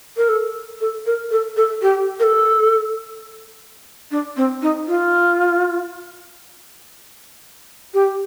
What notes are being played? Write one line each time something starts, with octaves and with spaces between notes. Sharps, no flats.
A#4
A4
A4
A#4
A4
A4
G4
A#4
A4
D4
C4
D#4
F4
G4